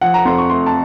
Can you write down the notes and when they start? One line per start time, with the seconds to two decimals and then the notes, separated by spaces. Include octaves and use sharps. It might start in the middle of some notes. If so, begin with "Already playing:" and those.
0.01 F3 F#5
0.14 A#5
0.25 F2 C6
0.38 C#6
0.50 A3 C6
0.66 A5